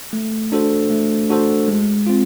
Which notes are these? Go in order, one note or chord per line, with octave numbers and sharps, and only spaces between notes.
A3
D4 F#4 A4 C5
A3
D4 F#4 A4 C5
G#3
C4 F4